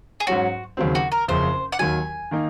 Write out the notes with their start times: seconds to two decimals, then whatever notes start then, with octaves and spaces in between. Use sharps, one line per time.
0.20 G#4
0.27 G#2 F#3 C#4 F#4
0.77 D#2 C#3 F#3 C4
0.95 F#4
1.12 A#4
1.28 F#1 F2 C#3 C5
1.72 F#5
1.79 D#2 D#3 F#3 G#5
2.31 D#3 A#3 D#4